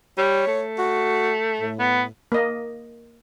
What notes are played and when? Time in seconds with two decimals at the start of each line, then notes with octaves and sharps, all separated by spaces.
0.18 G3 C#5
0.47 A3
0.79 F#4
1.60 A2
1.79 B3
2.32 A#3 D#5